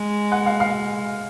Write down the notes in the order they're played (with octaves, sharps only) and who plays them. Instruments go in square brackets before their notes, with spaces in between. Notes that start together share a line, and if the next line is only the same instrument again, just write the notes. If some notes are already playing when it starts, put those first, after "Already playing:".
Already playing: [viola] G#3
[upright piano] F#5
F5
F5